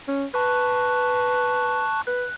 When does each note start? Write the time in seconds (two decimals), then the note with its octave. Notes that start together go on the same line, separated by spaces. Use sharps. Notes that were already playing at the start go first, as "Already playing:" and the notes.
0.08 C#4
0.34 B4 A5 C#6 F#6
2.07 B4 F#6